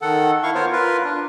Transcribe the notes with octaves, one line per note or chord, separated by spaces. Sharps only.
D#3 A4 F#5
E4 F5 C#6
B3 F4 A#4 C5 C#5
F4 A#4 B4
D4